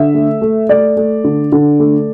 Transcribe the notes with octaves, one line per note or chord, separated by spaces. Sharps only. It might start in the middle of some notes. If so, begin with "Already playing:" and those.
Already playing: D3 E5
A3
A3
A3 D5
A3
D3
D3
A3